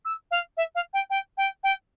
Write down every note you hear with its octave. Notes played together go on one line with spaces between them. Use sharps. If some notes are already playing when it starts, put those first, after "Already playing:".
E6
F5
E5
F5
G5
G5
G5
G5